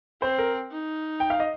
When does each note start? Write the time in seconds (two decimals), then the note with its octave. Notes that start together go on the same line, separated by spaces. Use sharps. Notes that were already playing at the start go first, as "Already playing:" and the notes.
0.22 C4 C5
0.39 A#4
0.72 D#4
1.20 G5
1.30 F5
1.40 D#5